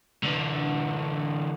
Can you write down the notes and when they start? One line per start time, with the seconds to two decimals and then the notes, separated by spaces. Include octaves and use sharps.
0.24 D3 E3